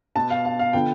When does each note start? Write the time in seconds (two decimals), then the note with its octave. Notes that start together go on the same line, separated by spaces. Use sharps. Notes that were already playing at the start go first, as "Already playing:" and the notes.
0.15 B2 B3 A5
0.30 F5
0.45 F5
0.59 F5
0.73 D3 F3 B3 G5